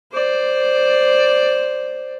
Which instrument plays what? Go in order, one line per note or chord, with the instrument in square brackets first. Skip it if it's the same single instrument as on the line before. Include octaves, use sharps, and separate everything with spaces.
[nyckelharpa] C5 D5